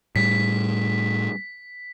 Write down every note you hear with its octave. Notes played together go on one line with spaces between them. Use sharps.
A2 G3 B6